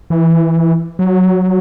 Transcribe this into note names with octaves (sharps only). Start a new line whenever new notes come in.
E3
F#3